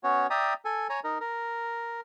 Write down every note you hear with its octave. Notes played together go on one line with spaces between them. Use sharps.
B3 C#4 F#4 C#5
D5 E5 G5 A#5 D#6
A4 G#5
C#5 G#5 A#5
D#4 A#4
A#4